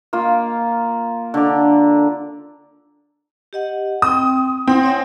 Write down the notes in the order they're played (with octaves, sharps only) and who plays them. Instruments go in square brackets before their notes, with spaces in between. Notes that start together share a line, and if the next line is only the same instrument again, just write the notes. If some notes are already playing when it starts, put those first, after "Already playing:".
[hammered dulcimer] A#3 F4
D3 D5
[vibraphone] G4 D#5 F#5
[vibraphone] C4 G5 [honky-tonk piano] D#6
[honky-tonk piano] C4 [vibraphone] E4 F#5
[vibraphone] C#5 E5 G#5